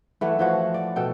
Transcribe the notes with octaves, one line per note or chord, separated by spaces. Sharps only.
E3 A3 F#5
E3 F3 F#4
D5
B2 A4 G5